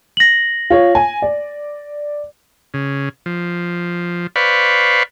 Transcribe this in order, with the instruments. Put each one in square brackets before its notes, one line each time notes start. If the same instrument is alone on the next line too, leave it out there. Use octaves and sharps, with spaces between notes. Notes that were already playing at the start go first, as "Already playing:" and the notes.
[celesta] A#6 F#7
[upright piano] F4 C#5
G#5
D5
[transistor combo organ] C#3
F3
B4 C5 D5 F5 B5 C#6